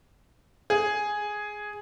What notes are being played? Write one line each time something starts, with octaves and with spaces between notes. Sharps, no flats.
G#4